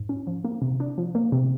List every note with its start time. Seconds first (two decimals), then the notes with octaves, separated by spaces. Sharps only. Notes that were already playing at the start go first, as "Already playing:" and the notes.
Already playing: G#2
0.09 C#4
0.27 F3
0.44 A#3
0.62 C3
0.80 D4
0.98 F3
1.15 A#3
1.32 C3